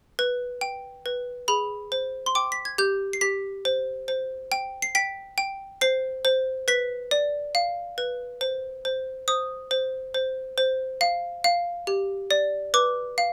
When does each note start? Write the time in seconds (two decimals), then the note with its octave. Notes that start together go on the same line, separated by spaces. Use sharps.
0.19 B4
0.61 G5
1.06 B4
1.48 G#4 B5
1.92 C5
2.26 C6
2.35 G5 D6
2.52 B6
2.65 G#6
2.78 G4 G6
3.13 C7
3.21 G4 B6
3.65 C5
4.08 C5
4.52 G5
4.82 C7
4.95 G5 B6
5.38 G5
5.81 C5 C7
6.25 C5
6.68 B4 B6
7.11 D5
7.55 F5
7.98 B4
8.41 C5
8.85 C5
9.28 C5 D#6
9.71 C5
10.14 C5
10.58 C5
11.01 F5
11.44 F5
11.87 G4
12.31 D5
12.74 B4 D6
13.18 F5